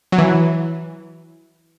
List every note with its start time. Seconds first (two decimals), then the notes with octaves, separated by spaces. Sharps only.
0.12 F#3
0.18 E3